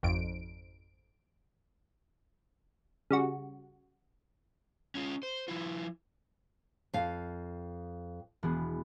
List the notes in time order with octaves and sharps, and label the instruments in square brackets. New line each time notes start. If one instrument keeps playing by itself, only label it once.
[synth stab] G#1 F2 D7
C#3 G3 F#4
[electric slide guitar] C#4 F4
C5
F3 E4 F4
[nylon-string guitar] F2 F5
[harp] E1 B3 G#4